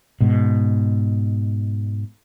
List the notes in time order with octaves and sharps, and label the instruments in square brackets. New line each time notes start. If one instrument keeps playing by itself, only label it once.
[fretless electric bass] G#2 B2